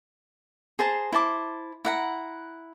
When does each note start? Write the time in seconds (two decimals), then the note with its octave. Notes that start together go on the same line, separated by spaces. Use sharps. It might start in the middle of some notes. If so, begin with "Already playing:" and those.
0.79 G#4 C5 A5 A#5
1.12 E4 C5 A5 D6
1.85 E4 F#5 A#5